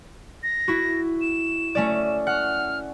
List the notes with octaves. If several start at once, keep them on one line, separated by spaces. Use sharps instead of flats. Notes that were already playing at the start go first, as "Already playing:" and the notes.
A#6
E4 F#4
E7
A3 C#4 D5
F#5 F6